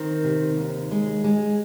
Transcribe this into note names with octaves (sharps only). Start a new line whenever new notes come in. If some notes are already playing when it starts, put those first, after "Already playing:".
Already playing: D#3 C4
C3
D#2
G#3
G#3